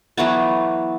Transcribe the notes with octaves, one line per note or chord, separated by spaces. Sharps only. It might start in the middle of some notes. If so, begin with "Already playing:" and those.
E3 F#3 A3 B3